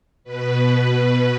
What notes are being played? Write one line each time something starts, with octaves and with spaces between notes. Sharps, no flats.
B2 B4